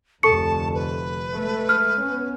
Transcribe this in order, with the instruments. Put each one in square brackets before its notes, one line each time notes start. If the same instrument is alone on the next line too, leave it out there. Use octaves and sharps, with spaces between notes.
[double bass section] F1 D2 [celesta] A4 C#6 C#7 [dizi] A5
[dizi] B4
[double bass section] G#3 A3
[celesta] F6
[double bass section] B3 C#4